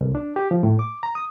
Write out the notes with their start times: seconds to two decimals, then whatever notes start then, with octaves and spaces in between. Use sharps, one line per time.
0.01 C2
0.15 D4
0.36 G4
0.51 F3
0.63 A2
0.79 D6
1.03 A#5
1.15 D#6